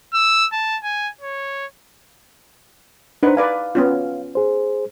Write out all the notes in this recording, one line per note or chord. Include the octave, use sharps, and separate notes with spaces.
E6
A5
G#5
C#5
D4 D#4 B4 C5 F#5
B4 D5 F5 G#5
B3 C#4 F4
G#4 C5